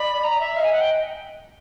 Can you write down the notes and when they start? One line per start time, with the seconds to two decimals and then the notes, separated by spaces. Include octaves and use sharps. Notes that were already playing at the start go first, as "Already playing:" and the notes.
Already playing: D5 B5
0.23 A#5
0.40 E5
0.56 D#5 F5
0.64 G#5
0.72 F#5
0.81 G5